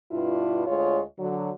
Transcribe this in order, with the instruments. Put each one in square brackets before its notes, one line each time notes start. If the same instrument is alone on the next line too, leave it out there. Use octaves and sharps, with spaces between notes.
[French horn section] G2 B2 D4 E4 F4
D2 G#3 F4 C#5
D3 F#3